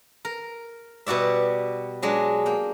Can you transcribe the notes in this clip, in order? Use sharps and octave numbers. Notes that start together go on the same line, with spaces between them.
A#4
B2 G3 F#4 D5 E5
F#3 G#3 D4
A#3 G5